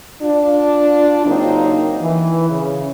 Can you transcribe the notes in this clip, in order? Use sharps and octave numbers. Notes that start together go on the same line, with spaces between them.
D4 F4
C#3 F#3 A#3 C4 D4 D#4
E3
C#3